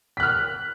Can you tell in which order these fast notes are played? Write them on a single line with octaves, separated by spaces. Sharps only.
B6 F#6 F6